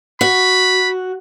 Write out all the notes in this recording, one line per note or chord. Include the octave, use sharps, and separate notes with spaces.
F#4 B5